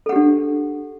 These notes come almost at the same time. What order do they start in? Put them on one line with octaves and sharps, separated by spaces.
A4 F#5 G4 D4